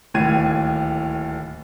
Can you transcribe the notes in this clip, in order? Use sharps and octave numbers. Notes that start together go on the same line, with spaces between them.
D1 D#2 A2 G#6 D#7